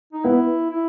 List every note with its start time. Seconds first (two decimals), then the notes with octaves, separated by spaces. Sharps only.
0.13 D#4
0.24 B3 E4
0.70 E4